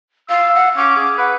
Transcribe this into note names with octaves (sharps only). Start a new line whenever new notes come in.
F5 E6
F#5
C#4 D6
G#4
B4 F#5